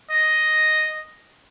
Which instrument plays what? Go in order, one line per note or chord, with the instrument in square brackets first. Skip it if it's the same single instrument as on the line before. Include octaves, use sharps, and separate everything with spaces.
[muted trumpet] D#5